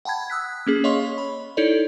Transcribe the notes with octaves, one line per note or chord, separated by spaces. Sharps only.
F#5 G5 A5 B5 G#6
D#6 E6 F#6 B6
A#3 C#4 G#4
C#5 D#5 F5 C6 C#6
B5
D#4 E4 A4 C#5 D5